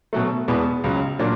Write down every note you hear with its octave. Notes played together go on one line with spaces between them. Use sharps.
B2 F#3 A3
E2 B2 G#3 B3
C#2 C#3 F#3
A#2 F#3 A#3 D4